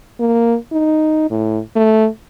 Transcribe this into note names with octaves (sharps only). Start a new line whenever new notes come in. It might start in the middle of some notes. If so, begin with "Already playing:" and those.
A#3
D#4
A2
A3